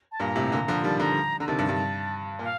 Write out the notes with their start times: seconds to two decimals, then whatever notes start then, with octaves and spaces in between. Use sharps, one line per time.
0.12 A5
0.20 G2 A#2 A#5
0.36 A2 C3
0.52 A#2 D3
0.68 D3 F3
0.84 D#3 G3 A5
0.99 D3 F3 A#5
1.40 D3 A#5
1.48 C3 D#3 A5
1.59 G2
1.69 G2
2.39 A#2
2.43 F5